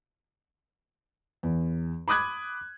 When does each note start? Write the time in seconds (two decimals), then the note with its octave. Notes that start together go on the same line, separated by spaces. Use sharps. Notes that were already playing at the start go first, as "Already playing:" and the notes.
1.43 E2
2.08 B5 D6 D#6 F#6 G#6